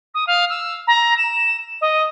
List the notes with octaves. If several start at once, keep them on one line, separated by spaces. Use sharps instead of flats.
D#6
F5
E6
A#5
E7
D#5